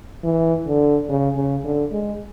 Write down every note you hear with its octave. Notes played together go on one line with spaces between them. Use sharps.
E3
D3
C#3
C#3
D3
G#3